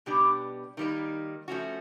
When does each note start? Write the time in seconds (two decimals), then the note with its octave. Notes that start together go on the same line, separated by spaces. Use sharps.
0.06 B2 G3 B3 D4 G4
0.77 D#3 G3 A#3 D#4
1.48 F3 A3 C#4 F#4